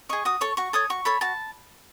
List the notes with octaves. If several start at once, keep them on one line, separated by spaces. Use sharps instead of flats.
G#4 D#5 C#6
F#4 D#6
A4 C#5 C#6
F#4 C#6
A4 C#5 D#6
F#4 C#6
A4 C#5 B5
F#4 A5